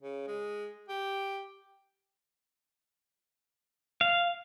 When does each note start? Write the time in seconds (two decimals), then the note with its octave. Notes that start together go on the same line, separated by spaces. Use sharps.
0.03 C#3
0.27 G#3
0.88 G4
4.01 F5